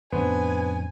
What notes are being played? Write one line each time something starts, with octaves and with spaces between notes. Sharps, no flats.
F2 A2 C#3 B3 D4 C5 G#5